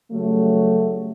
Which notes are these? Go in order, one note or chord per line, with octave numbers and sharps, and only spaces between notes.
C#3 F#3 G3 A3